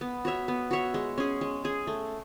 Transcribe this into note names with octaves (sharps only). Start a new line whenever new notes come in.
B3
F#4 C#5 E5
B3
F#4 C#5 E5
G#3
C#4 G#4
G#3
C#4 G#4
A3